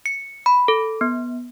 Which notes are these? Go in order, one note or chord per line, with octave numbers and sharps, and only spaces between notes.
C#7
B5
A4
B3